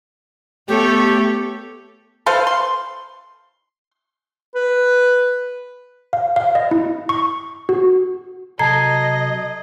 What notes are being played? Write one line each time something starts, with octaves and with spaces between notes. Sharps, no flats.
A3 B3 G4 A4 C#5
A4 B4 C5 F5
C6
B4
F5
F5
D#5
E4
C#6
F#4
C3 F#3 A4 D#5 A5 A#5 G#6 C7